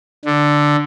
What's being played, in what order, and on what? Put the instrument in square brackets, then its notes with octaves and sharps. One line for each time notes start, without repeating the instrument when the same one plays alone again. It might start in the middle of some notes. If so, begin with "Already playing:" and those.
[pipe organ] D3